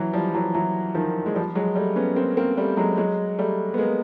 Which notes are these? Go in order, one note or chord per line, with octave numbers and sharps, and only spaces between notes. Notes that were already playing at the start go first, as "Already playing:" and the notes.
Already playing: E3 F#3
F3 G3
E3 F#3
E3 F#3
D#3 F3
G#3
F3 G3
F#3 G#3
G3 A3
B3 C#4
A#3 C4
A#3 C4
G3 A3
F#3 G#3
F#3 G#3
G3 A3
B3
G#3 A#3